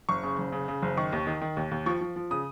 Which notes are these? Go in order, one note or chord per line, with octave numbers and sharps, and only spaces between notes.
F#1 C#6
C#3
F#1
C#3
C#3
F#1
D#3 C#6
D#2
D#3
D#3
D#2
D#2
F3 C#6
F3
F3
C#3 D#6